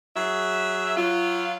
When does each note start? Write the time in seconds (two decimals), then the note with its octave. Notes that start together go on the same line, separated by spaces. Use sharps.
0.16 F#3 G#4 E5
0.97 F#3 F4